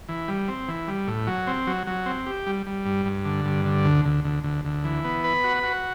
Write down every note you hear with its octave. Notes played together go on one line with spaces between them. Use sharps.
E3
G3
C4
E3
G3
A2
F#3
C4
F#3
F#3
C4
G4
G3
G3
G2
G2
D3
G2
D3
D2
D2
D2
D2
D2
E3
B3
B4
F#4
F#4